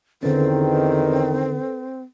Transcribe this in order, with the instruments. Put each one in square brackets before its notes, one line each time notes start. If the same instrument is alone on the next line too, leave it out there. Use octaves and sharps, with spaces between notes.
[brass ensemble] E2 D#3 [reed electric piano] D3 C#4 [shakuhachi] C4 [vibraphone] A4 B4